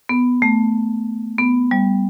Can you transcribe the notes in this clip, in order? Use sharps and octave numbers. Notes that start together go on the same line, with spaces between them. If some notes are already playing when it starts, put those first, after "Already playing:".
B3
A3
B3
G3